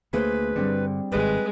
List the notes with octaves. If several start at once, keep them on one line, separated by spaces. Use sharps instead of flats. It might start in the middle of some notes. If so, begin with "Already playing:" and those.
D2 A3 A#3 G#4 B4 C5
G2 D3 G3 C4 D4
G#1 G2 G#3 B4